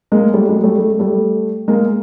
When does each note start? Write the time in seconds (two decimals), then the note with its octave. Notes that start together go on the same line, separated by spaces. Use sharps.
0.12 G#3 A#3
0.34 G3 A3
0.49 F#3 G#3
0.63 G3 A3
0.78 A3
0.89 G#3
0.99 G3 A3
1.68 G#3 A#3